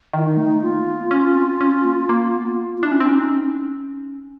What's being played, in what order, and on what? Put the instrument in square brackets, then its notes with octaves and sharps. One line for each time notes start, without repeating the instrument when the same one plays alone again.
[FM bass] D#3 [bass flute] E4
[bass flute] D#4
[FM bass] A3
[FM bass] A#3 [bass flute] F4
[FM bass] B3
C#4
C4
C#4
A#3
A#3
B3
[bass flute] F4
[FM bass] D4 [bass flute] E4
[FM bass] C#4
C4
[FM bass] C#4 [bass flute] D#4